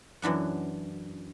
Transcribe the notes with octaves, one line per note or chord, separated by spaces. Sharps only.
F#2 E3 D4 F#5